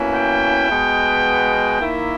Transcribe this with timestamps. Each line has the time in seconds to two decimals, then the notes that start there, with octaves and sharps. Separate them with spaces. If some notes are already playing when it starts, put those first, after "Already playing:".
Already playing: B2 A#3 C#4 E4
0.15 G5
0.70 B2 G#3 B3
1.80 D#3 A#3 E4 E5